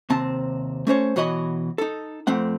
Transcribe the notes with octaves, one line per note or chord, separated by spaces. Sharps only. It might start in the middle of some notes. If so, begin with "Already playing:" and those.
D#2 C3 C4 A5
A3 C#4 C5 C#5
B2 E3 F#4 C#5 D#5 B5
D#4 A4
F2 A3 C4 F#5